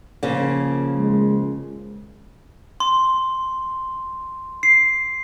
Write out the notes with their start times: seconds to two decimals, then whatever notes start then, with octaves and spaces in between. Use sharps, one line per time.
0.23 C#3 F3 A#3
0.97 G#3
2.80 C6
4.63 C7